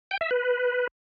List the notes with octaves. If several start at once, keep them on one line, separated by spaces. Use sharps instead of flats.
G5
E5
B4